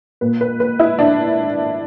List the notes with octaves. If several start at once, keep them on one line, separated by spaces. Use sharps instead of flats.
A#2 B4
B4
B4
E4
D4